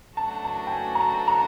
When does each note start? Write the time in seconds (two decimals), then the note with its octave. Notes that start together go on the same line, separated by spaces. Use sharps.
0.17 F#3 A3 D4 F#4 A4 A5
0.44 A5
0.67 G5
0.73 G#5
0.95 A#5
1.00 A5
1.28 A#5